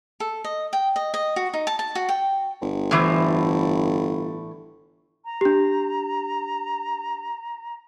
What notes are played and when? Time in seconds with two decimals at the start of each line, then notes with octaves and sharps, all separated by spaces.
0.20 A4
0.44 D#5
0.73 G5
0.96 D#5
1.14 D#5
1.36 F#4
1.54 D#4
1.67 A5
1.79 A5
1.95 F#4
2.09 G5
2.62 G1
2.91 A2 E3 C5
5.25 A#5
5.41 D4 G4